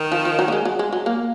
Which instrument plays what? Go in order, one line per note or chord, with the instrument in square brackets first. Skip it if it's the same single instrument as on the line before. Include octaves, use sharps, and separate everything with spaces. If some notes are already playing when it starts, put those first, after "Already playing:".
Already playing: [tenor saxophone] D#3
[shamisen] F3
F3
F#3
A#3
G#3
F#3
G#3
F#3
A#3